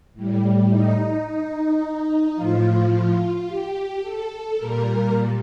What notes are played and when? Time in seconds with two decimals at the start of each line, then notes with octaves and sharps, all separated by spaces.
0.14 A2 G3
0.69 D#4
1.25 D#4
2.35 A2 F3 F4
3.46 G4
4.02 A4
4.57 A#2 G3 A#4